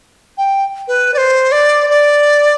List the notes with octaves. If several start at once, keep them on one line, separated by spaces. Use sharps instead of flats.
G5
B4
D5
C5
D5
D5